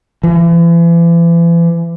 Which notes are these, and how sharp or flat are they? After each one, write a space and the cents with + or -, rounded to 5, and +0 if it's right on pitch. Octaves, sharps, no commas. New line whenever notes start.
E3 +40